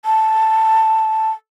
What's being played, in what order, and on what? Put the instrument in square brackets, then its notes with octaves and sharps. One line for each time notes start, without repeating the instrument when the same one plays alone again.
[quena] A5